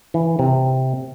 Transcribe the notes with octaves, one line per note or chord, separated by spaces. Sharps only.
E3
C3